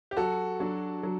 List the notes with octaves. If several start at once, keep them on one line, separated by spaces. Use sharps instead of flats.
G4
F#3 F#4 A4
F#3 D4 F#4
F#3